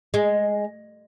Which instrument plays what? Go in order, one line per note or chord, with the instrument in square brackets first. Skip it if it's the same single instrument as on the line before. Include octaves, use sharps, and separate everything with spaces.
[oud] G#3